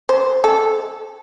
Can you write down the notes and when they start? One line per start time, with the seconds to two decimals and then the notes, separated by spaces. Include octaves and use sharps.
0.09 C5
0.44 A4